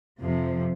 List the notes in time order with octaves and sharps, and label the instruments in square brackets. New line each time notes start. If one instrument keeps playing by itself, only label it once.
[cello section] F2 C3 F3